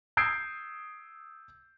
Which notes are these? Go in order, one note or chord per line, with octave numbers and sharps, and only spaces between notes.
D#6 E6 G6 G#6 C7 D7